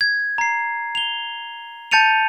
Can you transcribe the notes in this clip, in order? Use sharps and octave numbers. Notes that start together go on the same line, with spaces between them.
G#6
A#5 C7
F7 G7
A5 G6 A6 C#7 D#7 F7